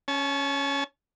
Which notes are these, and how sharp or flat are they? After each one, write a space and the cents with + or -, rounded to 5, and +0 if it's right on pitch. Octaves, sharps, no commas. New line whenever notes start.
C#4 +0 A5 -40